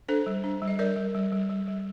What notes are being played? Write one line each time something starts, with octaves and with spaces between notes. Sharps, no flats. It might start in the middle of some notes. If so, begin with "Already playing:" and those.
D4 A4 C5
G3
D4
G3
D#5
G3 A#4 D5
G3
G3
G3
G3
G3